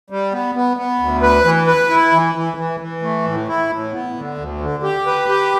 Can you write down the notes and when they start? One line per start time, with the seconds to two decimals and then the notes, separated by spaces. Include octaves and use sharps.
0.10 G3
0.32 B3
0.55 B3
0.77 B3
1.00 D2
1.22 B4
1.44 E3
1.67 B4
1.89 E4
2.12 E3
2.35 E3
2.57 E3
2.80 E3
3.02 A3
3.25 A2
3.48 E4
3.70 A2
3.93 B3
4.16 D3
4.38 D2
4.61 D3
4.83 G4
5.06 B4
5.29 G4